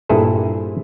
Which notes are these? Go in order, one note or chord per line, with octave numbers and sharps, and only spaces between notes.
G2 A#2 E4 G#4 A4 C5